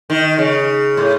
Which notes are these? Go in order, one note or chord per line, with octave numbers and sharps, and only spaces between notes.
D#3
C#3
A2